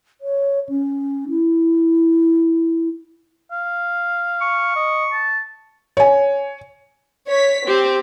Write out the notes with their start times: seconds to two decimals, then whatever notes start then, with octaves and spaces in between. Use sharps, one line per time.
0.21 C#5
0.69 C#4
1.29 E4
3.51 F5
4.41 C#6
4.76 D#5
5.12 A5
5.97 C#5 G#5
7.28 C#5 B6
7.67 C4 G4